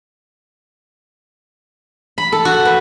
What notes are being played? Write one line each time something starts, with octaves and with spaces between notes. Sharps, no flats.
B5
A4
F#4
B4